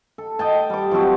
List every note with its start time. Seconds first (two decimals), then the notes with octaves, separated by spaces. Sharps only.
0.18 A4
0.39 D#5 G5 A5
0.70 G3 D6
0.91 F3 F#3 C4 F#4